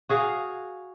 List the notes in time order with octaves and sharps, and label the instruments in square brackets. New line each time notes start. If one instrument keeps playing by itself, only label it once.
[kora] F#4 G#4 F5